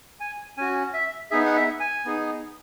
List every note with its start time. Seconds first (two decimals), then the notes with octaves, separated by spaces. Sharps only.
0.20 G#5
0.57 C#4 F#4 G#5
0.94 E5
1.31 B3 D#4 G#4 E5
1.46 F#5
1.56 E5
1.80 G#5
2.05 B3 D#4 G#4